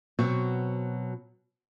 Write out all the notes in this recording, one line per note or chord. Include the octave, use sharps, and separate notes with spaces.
B2 F#3 C4 F#4